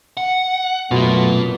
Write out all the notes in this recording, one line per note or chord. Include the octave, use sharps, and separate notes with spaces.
F#5
F#2 B2 A3 B3 F4 A#4